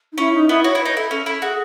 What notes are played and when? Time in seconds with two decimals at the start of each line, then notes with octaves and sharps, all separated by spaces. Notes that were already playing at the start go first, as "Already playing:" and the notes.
0.12 D#4
0.18 C#4 E4
0.34 D#4
0.49 B3 E4
0.64 F#4 C#5
0.75 E4 B4
0.86 D#4 B4
0.96 E4 A4
1.11 C#4 A4
1.26 E4 A4
1.42 F#4 G#4